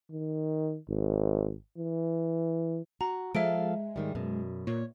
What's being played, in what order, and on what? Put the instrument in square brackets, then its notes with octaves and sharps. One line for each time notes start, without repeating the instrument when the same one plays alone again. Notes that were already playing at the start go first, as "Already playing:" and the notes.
[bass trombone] D#3
G#1
E3
[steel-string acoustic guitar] F#4 [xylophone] A#5
[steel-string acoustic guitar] F3 A4 F5 [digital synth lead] G#3 [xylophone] E5 D7
[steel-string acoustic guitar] G#2 D#3 G3
F#2 B2
[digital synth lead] A#2 [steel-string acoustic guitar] C#5